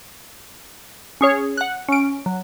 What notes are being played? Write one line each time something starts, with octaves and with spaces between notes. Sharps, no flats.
C#4 G#4 C#5
F#5 F#6
C#4 D7
F#3